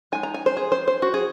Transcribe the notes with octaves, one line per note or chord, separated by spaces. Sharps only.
G#3 D#4 G#5
A#5
G#5
C5
G#4
C5
C5
F#4
G#4